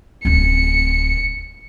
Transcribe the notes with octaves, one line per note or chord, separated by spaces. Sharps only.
D1 C4 C#7